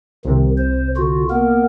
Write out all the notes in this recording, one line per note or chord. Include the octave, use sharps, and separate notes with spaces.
C2 C3 D#3
C5
D3 F4 F#4
A#3 B3 A#4